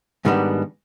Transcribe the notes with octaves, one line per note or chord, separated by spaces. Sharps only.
G#2 D#3 G3 B3 D4